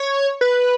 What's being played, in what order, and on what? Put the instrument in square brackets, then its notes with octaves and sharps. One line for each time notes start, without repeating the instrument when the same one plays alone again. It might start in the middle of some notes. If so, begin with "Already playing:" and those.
Already playing: [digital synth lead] C#5
B4